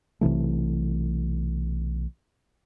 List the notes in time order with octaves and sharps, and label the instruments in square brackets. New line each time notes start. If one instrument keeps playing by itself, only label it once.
[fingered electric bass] B1 C3 E3 A3